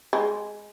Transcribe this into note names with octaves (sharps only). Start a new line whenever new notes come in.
G#3